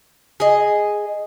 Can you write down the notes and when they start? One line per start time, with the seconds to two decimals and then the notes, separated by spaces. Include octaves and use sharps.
0.40 G#4 D#5